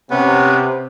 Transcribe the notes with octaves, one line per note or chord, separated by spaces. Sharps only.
C3 B3 C#4